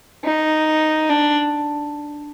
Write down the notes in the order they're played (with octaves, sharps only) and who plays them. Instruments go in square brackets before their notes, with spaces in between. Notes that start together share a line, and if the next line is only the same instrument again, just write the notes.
[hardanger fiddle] D#4
D4